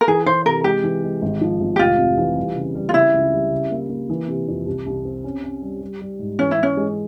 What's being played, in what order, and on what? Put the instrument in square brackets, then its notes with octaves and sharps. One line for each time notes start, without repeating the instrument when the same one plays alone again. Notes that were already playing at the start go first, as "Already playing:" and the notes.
[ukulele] A#4
[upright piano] E3 [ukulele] G#4
[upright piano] E3 [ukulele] C5
[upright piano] C3 [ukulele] A#4
[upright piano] G#3 [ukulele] G4
[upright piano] E3
G#3
G#1
F3
G#1
[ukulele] G4
[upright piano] F1 [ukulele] F4
[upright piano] C3
E3
G3
C#3
G3
[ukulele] F4
[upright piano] C#3 [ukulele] E4
[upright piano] C#2
G3
C#3
A#3
A#3
E3
C3
F2
C2
C2
C4
C#4
C#4
G3
G3
G3
G#2
[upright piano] E3 [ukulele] C#4
[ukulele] E4
[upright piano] E3 [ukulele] C#4
[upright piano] G#3